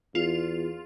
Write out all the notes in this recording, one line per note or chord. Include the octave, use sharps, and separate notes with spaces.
E2 F4